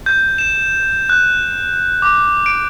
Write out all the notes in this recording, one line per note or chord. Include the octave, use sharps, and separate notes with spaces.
G6
E7
F#6
D6
D7